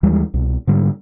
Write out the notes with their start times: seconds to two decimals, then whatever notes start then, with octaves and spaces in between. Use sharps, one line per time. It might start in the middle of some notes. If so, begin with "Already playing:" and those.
0.03 D#2 E3 G3 G#3
0.34 C2 B2
0.67 G#2 D3 G3